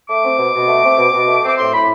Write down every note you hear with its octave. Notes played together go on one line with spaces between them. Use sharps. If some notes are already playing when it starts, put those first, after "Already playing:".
A3 D6
C4
B2
B2
A3
C4
B2
B2
A3
C4 D6
A2 C6
A2 B5